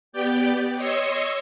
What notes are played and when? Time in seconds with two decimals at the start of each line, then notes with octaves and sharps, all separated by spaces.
0.12 B3 G4 D5 G5
0.75 C#5 D#5 C6 C#6 E6